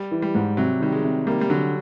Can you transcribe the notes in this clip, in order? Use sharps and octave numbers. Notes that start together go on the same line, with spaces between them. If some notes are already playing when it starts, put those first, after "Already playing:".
Already playing: G3
E3
G3
G#2
C3 F#3
D#3 G3
G#3
C3
G3 A#3
G3
D3 F#3